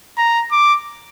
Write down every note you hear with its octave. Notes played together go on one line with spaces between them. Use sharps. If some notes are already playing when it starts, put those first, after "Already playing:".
A#5
D6